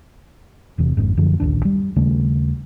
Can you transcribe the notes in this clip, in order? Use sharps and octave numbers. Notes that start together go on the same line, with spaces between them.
E1 E2 C3
G#1 F2 G#2
F#2 D3 F3
D1 A#1 D#2 D4
G3
D#2 C#3 G3 A3